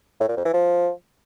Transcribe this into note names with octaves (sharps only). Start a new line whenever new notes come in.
A2
A#2
F2
E3
F3